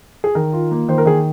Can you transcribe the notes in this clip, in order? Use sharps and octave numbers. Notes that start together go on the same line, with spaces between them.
G#4
D#3 A#4
F4
A#3
D#3 C5
A#4
D#3 G#4